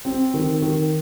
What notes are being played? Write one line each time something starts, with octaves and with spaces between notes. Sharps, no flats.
C4
D#3
D#3